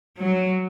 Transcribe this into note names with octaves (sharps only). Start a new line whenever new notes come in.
F#3